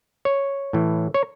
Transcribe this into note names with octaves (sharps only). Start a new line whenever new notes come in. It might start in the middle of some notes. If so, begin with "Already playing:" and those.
C#5
A2 E3
C#5